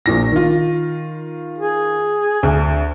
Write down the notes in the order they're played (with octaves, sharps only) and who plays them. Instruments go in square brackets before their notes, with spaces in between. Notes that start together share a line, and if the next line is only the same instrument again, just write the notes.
[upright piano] A#1 A#2 A#6
D#3 F4
[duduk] G#4
[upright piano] D2